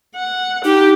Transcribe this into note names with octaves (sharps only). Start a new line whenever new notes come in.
F#5
D#4 G4